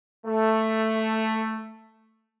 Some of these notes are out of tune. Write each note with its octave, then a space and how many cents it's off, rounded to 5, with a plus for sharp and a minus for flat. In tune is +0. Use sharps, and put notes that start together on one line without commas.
A3 +5